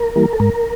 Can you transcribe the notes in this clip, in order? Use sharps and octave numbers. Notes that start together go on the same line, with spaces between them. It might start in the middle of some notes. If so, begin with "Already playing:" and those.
Already playing: A#4
E3 G3 A#3
A4
G#2 A#4